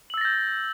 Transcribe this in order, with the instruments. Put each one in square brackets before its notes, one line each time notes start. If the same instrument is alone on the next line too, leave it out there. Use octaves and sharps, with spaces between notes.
[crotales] F#7
E6
A6
A#6
G6